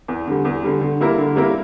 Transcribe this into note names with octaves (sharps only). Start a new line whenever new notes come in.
E2
D3 G3
E2
D3 G3
D3
G3 A#3 E4 A#4
D3
G3 A#3 E4 A#4